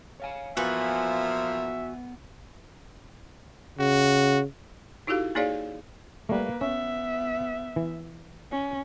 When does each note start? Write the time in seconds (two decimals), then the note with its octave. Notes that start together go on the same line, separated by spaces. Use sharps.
0.20 C#5 F5 G#5
0.57 A#2 E3 F3 B3 F#4 E5
3.79 C#3 F#4
5.07 D#4 E4 F#4 G4 A4 F5
5.35 A#3 D#4 G#4 C#5 D5 F5
6.29 G3 A3 A#3 B4
6.61 B3 C#4 E5
7.76 E3
8.51 C#4